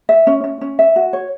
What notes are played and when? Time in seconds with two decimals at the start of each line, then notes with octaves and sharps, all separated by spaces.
0.09 E5
0.27 C#4
0.44 C#4
0.61 C#4
0.79 E5
0.96 F#4
1.13 C#5